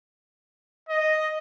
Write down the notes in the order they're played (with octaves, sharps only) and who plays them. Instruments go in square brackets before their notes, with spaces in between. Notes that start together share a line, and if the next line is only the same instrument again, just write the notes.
[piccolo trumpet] D#5